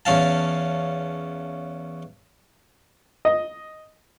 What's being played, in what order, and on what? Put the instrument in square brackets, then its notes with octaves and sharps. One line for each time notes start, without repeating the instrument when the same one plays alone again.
[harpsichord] E2 C#4 F5 A5
[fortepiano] D#5